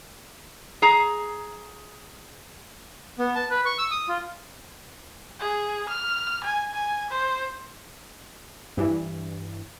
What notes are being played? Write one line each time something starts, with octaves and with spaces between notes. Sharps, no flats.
G#4 A#5
B3
A5
B4
C#6
E6
D#6
F4
G#4
F6
G#5
G#5
C5
G2 E3